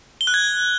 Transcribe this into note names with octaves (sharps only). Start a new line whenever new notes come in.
G7
F#6
G#6